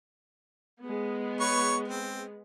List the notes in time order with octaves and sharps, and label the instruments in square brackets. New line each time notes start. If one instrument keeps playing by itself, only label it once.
[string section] G#3 B3
[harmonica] B4 C#5 C#6
C4